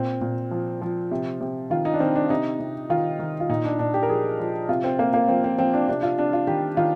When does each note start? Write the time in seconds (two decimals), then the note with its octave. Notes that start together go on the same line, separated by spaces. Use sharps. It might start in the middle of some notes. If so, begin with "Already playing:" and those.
Already playing: A#2 C4
0.21 A#2
0.51 F3
0.82 F3
1.11 C3
1.41 C3
1.70 D#3 F4
1.85 D#4
1.94 D4
2.00 D#3 C4
2.15 D4
2.30 C3 D#4
2.59 C3
2.90 D#3 F4
3.19 D#3
3.40 F4
3.49 A#2 D#4
3.65 D4
3.79 A#2 D4
3.94 G4
4.03 A#4
4.09 F3 G#4
4.39 F3
4.69 C3 F4
4.84 C4
4.99 C3 A#3
5.14 A#3
5.28 F3 C4
5.44 C4
5.59 F3 C4
5.74 D4
5.88 C3 D4
6.03 F4
6.18 C3 D4
6.33 F4
6.47 D#3 G4
6.77 D#3 F4